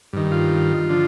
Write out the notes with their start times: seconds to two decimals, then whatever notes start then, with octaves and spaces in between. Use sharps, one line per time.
0.13 G2 D#3
0.32 F4
0.90 D3 F3